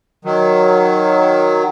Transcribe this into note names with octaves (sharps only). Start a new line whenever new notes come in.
D#3 F#3